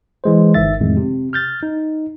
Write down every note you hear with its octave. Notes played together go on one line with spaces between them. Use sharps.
E3 G#3 C5
G1 D#3 E5 A6
F2 A2 D#3 G#3
C3
F6 G6 A6
D#4